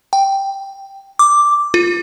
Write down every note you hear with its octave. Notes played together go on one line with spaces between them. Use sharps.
G5
D6
F4